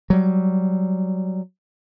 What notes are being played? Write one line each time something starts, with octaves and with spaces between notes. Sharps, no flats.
F#3 G3